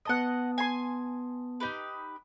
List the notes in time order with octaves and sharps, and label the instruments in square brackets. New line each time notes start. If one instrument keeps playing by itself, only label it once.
[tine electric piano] B3 A5 D#6 [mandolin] D#5 F#5
[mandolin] G#5 C6
D#4 G4 B4